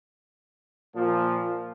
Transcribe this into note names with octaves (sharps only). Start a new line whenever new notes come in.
A#2 F3